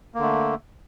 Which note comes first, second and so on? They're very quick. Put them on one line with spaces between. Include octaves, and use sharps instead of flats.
A#3 D3 A3